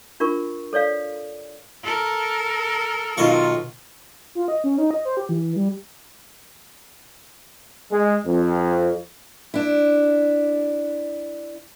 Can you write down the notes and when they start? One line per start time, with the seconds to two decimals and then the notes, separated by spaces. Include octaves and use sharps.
0.20 D4 F4 A#4 C#6
0.73 A4 C#5 D5 F5
1.84 A4 A#4
3.18 B1 D#3 F4 D#5 C#6
4.35 F4
4.48 D#5
4.64 C#4
4.78 D#4
4.91 D#5
5.05 C5
5.17 G4
5.29 E3
5.56 G3
7.91 G#3
8.26 F2
9.54 D4 E4